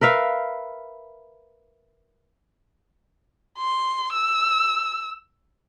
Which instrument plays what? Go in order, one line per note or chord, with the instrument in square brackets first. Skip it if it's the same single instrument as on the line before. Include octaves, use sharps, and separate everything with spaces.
[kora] A#4 B4 E5 F5
[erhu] C6
E6